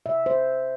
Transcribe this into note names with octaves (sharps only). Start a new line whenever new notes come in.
C3 E5
C5